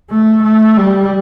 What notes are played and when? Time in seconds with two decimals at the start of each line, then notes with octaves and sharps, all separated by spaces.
0.10 A3
0.43 A3
0.77 G3